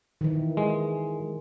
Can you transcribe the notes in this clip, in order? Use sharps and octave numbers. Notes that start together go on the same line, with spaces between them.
D#3 E3
G#3